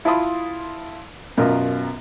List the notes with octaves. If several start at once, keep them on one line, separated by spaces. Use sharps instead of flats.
E4 F4 A5 B5 C6 D#6
F#2 B2 F4 A#4